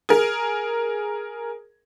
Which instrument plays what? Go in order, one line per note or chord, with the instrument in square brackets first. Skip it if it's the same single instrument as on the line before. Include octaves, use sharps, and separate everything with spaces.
[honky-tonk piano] G#4 A#4